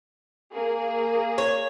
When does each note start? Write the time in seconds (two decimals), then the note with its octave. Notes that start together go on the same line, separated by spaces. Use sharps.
0.51 A#3 G#4
1.38 C#5